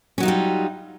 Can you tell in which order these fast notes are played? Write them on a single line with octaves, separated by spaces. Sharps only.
C#4 F#3 D#4 F4 G3